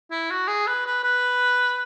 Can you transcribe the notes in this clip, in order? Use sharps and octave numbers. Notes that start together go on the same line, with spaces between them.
E4
F#4
G#4
B4
B4
B4